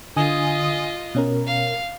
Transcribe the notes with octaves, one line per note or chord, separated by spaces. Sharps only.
D3 F4 D#5 G#5 D#6
B2 C#4 A#4
F5